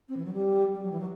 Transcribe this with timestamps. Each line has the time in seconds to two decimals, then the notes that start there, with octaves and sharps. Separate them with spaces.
0.09 C4
0.17 E3
0.25 F#3
0.33 G3
0.74 G3
0.84 F#3
0.92 E3
1.00 F#3